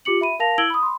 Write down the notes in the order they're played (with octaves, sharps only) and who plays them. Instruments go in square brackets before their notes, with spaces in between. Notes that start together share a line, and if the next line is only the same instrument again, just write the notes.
[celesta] F4 G4 D6 C#7 F#7
E5 B5 D#7
A#4 F5 A5 A#6 F7
E4 E6 G#6 D7 F#7 G7
B5 D#6
B5 C6